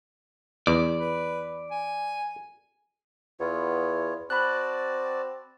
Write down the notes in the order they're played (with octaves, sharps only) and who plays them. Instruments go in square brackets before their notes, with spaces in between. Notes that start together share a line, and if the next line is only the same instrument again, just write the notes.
[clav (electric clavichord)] E2 [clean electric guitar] D5
[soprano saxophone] B4
G#5
[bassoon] E2 [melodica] B3 F4 C#5
[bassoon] C4 [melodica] F#4 D5 A5 [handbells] B5 F#6